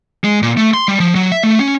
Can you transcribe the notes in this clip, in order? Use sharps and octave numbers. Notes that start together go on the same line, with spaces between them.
G#3
A#2
A3
C6
G3
F3
F#3
E5
A3
C#4